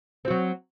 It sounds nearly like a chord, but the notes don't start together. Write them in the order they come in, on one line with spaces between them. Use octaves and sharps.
C4 F#4 F#3